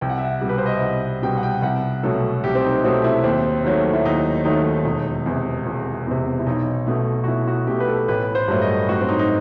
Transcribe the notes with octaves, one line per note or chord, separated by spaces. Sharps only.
C2 G5
F#5
E5
F#5
B2 G3
B4
C5
D#5
E5
C2 F#5
B2 G3 G5
F#5
G5
C2 F#5
B2 F#3 A3 A4
C2 G4
C4
D#4
B2 F#3 A3 C4
E4
D#2 C4
D#3 F#3 A3
E4
D#2 D#4
D#3 F#3 A3 D#4
E1
E2 C3
E1
E2 C3
E4
B1 D#4
B2 A3
F#4
B1 E4
F#4
B2 A3 G4
B4
A4
A1 B4
C5
G2 F#3 A3
D#5
A1 F#4
C4
D#4
D#4